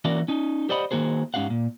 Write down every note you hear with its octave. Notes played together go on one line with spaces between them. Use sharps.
E3 A#3 C#4 F#4 A#4 D5
C#4 D#4
G4 C5 D5 D#5 F#5 B5
D#3 A#3 F#4 G#4 C5
G#2 C#4 G4 F5 F#5
A#2